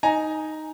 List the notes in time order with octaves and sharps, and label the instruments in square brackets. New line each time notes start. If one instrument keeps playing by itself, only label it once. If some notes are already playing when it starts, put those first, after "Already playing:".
[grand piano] D#4 G#5 A#5